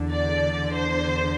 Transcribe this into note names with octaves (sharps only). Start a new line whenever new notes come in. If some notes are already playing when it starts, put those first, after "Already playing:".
Already playing: E2 D3
D5
C5